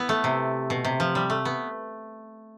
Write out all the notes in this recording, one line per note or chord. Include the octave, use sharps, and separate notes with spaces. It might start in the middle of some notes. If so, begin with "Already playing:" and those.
Already playing: B3 E4
A3
C3
B2
C3
F3
G3
A3
B3